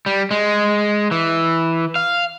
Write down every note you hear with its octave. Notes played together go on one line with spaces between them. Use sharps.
G3
G#3
E3
F5